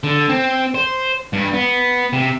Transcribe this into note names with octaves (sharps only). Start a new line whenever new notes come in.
D3
C4
C5
G2
B3
C3